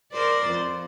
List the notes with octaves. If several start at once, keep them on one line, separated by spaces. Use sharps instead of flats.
A#4 C5 D5
F2